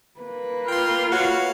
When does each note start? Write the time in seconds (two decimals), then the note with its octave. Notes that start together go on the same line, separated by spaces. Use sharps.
0.21 A#3 B4
0.68 F4 G5 C6
1.12 F#4 C#5 F5